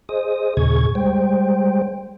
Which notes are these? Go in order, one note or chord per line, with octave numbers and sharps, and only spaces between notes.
G#4 C5 D#5 D#6
D#2 A#2 C#3 G#4 C#6 G#6
G3 G#3 C5 G5